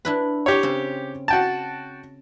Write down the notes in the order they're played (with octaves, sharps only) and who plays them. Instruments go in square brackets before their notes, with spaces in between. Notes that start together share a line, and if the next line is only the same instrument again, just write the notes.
[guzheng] D4 E4 B4
[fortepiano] G4 C#5
[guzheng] C#3 C4
[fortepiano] F#4 G5 A5